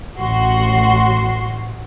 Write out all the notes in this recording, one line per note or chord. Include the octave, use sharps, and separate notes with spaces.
A1 F#4 C6